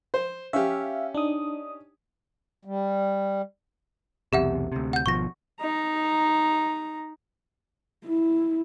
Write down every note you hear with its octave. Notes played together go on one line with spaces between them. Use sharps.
C5
C#4 G4 E5 F5
D4 D#4 D#6
G3
B1 E2 C3 G4 E5 F#5
D2 C3
F#5 G6
G#1 B2 F3 C#6 A#6
D#4 A#5
E4